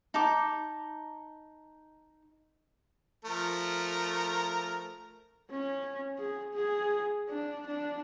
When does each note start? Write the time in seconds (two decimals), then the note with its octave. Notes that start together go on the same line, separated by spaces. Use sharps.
0.14 D#4 A5 D6
3.25 F3 A3 A#4
5.51 C#4
6.19 G#4
6.54 G#4
7.29 D4
7.67 D4